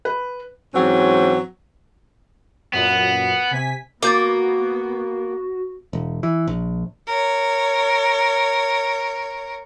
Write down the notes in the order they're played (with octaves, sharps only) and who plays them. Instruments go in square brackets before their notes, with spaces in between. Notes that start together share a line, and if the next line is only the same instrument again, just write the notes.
[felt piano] B4
[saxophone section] G#2 E3 F#3 C4 C#4
[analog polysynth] F#2 A#2 [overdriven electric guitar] B3
[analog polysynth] C3 G#5 B6
[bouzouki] A#3 [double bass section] B3 [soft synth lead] F#4 [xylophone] D6 G6 A6
[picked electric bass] E1
E3
A#1
[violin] A#4 C#5